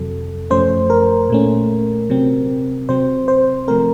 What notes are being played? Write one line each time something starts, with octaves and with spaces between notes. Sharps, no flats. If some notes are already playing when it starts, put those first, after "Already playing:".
Already playing: F2 C3 F#3 A4
F#2 F3 A3 C#4 C5
A#4
A#2 A3 C#4
C3 F#3 C4
C3 F#3 C4 C5
C5
C3 F3 A3 C4 A#4